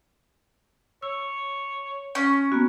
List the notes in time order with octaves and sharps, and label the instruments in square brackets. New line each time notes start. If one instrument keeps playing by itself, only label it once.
[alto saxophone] C#5 [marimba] E6
[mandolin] C#4
[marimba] A#3 B3 F#4